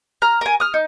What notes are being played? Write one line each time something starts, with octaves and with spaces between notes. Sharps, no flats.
A#5 F6
A#4 G#5
D#6 F6
D#4